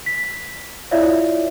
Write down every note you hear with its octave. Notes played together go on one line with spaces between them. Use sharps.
B6
E4 F4 C#5 D5 E5 F5